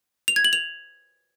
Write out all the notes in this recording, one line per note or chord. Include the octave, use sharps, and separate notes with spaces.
F7
G#6
F#7
F7